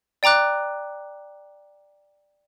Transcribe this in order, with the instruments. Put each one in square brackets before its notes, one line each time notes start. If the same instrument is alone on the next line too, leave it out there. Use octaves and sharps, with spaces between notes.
[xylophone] D5 G5 A#5 D6 F#6